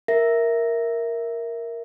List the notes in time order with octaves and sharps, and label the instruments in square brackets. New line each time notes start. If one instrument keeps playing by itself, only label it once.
[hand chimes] A#4 E5 A#6